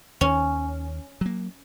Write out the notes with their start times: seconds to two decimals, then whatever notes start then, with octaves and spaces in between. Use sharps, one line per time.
0.21 D#2 D#3 C#4
1.21 F#3 A#3